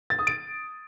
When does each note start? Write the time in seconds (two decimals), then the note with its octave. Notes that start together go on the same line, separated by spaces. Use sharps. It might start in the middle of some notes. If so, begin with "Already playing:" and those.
0.10 A6
0.19 D#6
0.27 D7